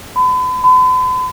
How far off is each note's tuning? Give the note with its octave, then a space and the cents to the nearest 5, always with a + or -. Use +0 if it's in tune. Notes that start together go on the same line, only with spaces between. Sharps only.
B5 +40
B5 +45